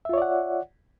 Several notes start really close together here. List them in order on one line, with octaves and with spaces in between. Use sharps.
E5 F4 C#5 D5 F#5